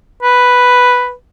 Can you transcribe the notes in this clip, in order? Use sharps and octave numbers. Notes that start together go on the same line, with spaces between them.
B4